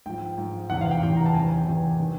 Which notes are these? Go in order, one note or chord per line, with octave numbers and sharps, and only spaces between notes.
G#2 F3 G5
G#2 F3
E2 C3 E3 F#5
F5
G5
E2 C3 E3 G5
A#5
A5
E2 C3 D#3 G#5
G5
E2 C3 D#3 G#5
C3 D#3